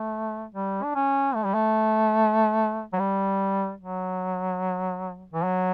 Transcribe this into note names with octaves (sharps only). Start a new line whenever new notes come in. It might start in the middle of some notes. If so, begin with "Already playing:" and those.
Already playing: A3
G3
D4
C#4
A3
G3
A3
F#3
G3
F#3
E3
F#3